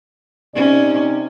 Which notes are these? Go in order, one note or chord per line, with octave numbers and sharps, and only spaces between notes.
C3 C#4 D#4 D5